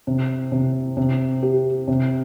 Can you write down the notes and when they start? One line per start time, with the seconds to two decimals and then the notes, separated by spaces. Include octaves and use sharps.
0.07 C3
0.52 C3
0.97 C3
1.43 G4
1.88 C3